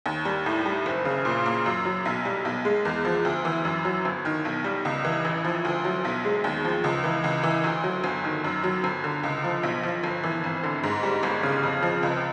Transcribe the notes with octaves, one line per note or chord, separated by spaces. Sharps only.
D#2
G3
A2
G3
F#1
C#3
A#2
A#3
F#2
F#3
B1
G3
B1
G#3
E2
F3
D2
E3
F#2
F#3
G1
D#3
B1
G3
C#2
E3
A1
F3
D2
F#3
B1
G#3
D#2
F3
C#2
E3
C#2
E3
D2
F#3
G1
D#3
F#2
F#3
G1
D3
C#2
F3
B1
F3
G1
E3
G#1
D3
G#2
G3
G1
C#3
F2
F3
C#2